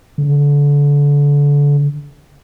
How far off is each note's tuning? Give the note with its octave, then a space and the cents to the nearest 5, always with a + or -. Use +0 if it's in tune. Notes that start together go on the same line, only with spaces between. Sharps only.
D3 -30